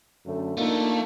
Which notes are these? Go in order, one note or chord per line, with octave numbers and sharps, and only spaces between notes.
F#2 D3 A3
A3 A#3 D4 D#4 F4